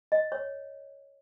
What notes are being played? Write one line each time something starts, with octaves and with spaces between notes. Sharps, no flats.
D#5
C#5